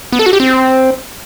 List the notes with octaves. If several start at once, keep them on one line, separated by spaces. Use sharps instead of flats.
B3
A4
F#4
G4
C4